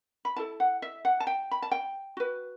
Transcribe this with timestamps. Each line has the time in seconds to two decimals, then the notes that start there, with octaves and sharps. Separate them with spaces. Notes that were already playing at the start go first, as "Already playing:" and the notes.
0.25 B5
0.36 E4 A4 A5
0.60 F#5
0.82 E5
1.05 F#5
1.20 A5
1.27 G5
1.51 B5
1.62 A5
1.71 G5
2.17 F#4 B4